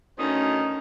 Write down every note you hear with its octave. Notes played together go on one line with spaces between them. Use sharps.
D2 D#3 C#4 D#4